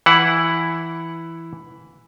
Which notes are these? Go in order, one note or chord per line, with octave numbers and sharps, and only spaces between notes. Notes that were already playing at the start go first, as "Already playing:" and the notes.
E3 E4 F#5